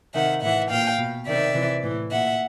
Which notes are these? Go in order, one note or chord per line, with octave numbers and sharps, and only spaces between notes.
C3 D#3 E5 F#5
A2 E3 E5 F#5
A#2 F5 G5
B2
C3 D#3 D5 E5
C3 E3
A2 E3
A#2 E5 F#5